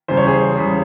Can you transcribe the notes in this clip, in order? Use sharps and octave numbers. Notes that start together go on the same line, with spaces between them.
E2 C#3 G3 C5
C#5
G#4 C5
E2 C#3 G3